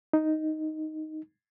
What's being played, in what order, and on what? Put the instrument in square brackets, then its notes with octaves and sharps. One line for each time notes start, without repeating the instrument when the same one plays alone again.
[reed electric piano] D#4